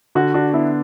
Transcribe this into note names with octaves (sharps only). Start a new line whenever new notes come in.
D3 F#4
D4 F#4
B3 E4